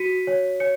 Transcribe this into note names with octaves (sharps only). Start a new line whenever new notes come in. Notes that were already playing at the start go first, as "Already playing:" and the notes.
Already playing: F#4 B6 C#7 D#7
C#5
C#5 C#7